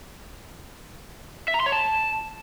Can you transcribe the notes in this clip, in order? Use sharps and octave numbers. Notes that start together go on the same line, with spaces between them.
E5
A#5
C6
C#5
A5